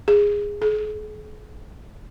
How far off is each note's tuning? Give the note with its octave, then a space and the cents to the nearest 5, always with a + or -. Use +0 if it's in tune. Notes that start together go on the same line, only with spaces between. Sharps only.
G#4 -10
G#4 +45